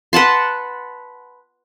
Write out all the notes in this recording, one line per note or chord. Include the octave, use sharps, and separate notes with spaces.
B4 F#5 A5 C6